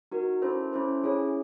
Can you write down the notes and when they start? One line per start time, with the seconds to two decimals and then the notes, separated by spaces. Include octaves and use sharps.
0.12 D#4 F#4 A#4
0.42 C#4 E4 A4 C5
0.73 C#4 E4 A4 C5
1.03 C#4 E4 G#4 C#5